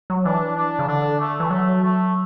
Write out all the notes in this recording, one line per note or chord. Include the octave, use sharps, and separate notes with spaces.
F#3
E3 D4
D4
C#3
D3 D4
A3
E3
F#3 A3
A3